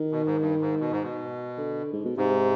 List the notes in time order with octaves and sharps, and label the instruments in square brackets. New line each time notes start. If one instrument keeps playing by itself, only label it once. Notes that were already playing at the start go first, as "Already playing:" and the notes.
Already playing: [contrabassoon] D#3
[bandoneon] B2
G#2
G2
G#2
B2
G#2
B2
[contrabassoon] D3
G#2
B2
[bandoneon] G#2 [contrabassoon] C3